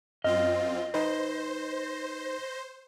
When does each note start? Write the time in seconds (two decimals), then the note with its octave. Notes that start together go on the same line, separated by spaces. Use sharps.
0.24 F#2 C4 F4 D#5 F6
0.94 D#4 B4 C5